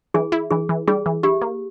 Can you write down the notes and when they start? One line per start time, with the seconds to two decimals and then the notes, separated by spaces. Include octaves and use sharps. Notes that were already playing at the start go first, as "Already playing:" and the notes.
0.14 E3 G#4
0.32 E4
0.50 E3 G#4
0.69 E3
0.87 G3 G#4
1.06 E3
1.23 E4 G4
1.41 A#3